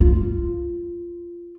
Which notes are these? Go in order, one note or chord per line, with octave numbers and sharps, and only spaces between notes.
F4